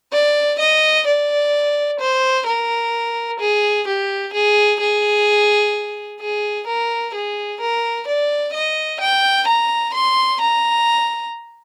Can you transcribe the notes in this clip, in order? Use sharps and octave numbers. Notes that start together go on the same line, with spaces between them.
D5
D#5
D5
C5
A#4
G#4
G4
G#4
G#4
G#4
A#4
G#4
A#4
D5
D#5
G5
A#5
C6
A#5